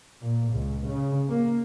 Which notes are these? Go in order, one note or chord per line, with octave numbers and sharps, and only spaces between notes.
A#2
C#2
C#3
A#3